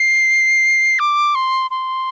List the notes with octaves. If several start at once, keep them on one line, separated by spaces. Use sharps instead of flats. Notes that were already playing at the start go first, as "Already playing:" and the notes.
Already playing: C7
D6
C6
C6